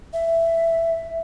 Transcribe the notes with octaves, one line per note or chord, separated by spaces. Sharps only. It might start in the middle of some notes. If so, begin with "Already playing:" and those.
E5